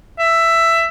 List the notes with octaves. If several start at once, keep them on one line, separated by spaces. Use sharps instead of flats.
E5